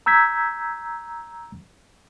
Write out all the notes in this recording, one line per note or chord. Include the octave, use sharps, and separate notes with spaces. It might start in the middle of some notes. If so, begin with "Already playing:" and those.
A#5 E6 G6 G#6 B6